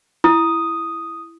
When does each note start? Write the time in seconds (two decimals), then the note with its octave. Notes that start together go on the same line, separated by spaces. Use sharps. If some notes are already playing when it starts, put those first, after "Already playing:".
0.24 E4 D#6